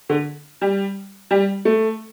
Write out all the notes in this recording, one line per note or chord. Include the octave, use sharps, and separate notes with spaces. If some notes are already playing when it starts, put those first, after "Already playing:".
D3
G3
G3
A3